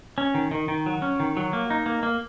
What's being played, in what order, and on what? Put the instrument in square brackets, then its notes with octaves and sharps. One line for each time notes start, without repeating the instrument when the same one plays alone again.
[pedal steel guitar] C#4
D#3
D#3
D#3
F#3
C#4
D#3
F#3
A#3
D#4
A#3
A#3